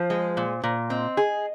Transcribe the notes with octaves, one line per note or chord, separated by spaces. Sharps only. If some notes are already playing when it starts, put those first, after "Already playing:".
Already playing: F3 C5
G#3
A#2
A#2
C4 D#5
G#4